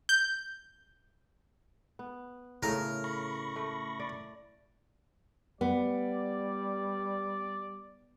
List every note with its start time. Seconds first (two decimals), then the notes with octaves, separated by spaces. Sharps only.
0.09 G6
1.99 B3
2.63 A2 C#3 A3 A#4
3.04 B5 C#6 A#6
3.56 A3
4.00 D5
5.61 G3 B3 D5